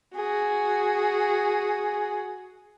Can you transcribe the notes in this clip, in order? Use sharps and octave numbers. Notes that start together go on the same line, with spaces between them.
F#4 G#4